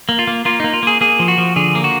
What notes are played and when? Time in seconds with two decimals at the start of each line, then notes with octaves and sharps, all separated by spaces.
0.09 A#3
0.19 F4
0.27 A#3
0.45 A#3 F4
0.60 A#3 D#4
0.73 F4
0.83 A#3 G#4
1.01 A#3 G#4
1.19 F3
1.28 F#4
1.38 F3
1.56 D3 G#4
1.75 A#3
1.84 F#4